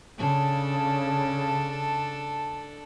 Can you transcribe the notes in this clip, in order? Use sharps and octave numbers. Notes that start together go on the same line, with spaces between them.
C#3 D4 A4